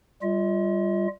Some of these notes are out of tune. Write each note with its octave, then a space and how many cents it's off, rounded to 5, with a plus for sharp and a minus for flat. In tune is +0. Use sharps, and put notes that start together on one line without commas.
G3 +0 F4 +0 D#5 +40